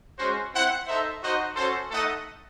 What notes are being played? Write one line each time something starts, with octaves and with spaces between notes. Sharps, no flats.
G#3 C#4 F#4 C5
C4 E4 C5 F#5
D#4 A4 C5 E5
D#4 F#4 C5 D#5 F#5
C#4 F#4 A4 C5
A3 D#4 A4 D#5 F#5